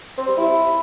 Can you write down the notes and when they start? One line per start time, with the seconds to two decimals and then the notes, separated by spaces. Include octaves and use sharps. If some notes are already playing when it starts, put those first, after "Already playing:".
0.18 C4
0.28 G3
0.37 E4